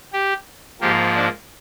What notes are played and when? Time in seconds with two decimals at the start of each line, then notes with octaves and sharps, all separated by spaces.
0.13 G4
0.81 G#2 F3 A#3 G4
1.16 D4